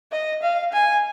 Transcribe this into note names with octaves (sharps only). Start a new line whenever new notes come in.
D#5
F5
G#5